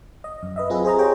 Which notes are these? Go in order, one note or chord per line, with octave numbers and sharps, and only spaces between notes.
D#5
F#2
B4 D#5 E5
C4 F4 G#4 B4
G#4 C5 D#5 A#5
G4 G#4 C5 C#5 G5